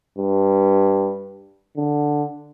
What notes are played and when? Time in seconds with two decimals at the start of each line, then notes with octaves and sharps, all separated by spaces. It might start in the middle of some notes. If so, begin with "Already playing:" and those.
0.18 G2
1.77 D3